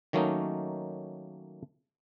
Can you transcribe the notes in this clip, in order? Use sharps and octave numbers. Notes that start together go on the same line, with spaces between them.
D#3 F#3 A3 A#3 C#4 D#4